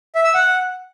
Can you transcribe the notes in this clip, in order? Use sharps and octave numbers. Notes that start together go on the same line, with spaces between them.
E5
E6
F#5